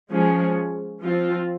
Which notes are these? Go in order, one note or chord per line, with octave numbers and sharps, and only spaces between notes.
F3 G#3 C#4 G#4
F3 C4 F4